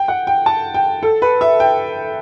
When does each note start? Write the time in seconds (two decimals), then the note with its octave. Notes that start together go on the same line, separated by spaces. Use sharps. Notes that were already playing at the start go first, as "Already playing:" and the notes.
Already playing: G5
0.08 F#5
0.27 G5
0.46 A5
0.74 G5
1.03 A4
1.22 B4
1.41 E5
1.60 G5